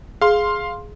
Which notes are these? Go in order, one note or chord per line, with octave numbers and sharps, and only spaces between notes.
G#4 F5 C6